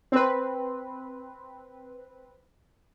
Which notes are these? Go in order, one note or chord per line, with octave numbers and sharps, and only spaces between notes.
C4 B4